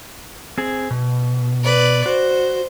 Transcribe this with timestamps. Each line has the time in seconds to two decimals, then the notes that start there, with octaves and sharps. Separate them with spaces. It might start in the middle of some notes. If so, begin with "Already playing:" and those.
0.58 C4 G#4
0.91 B2
1.63 B4 D5
2.06 F#4 C5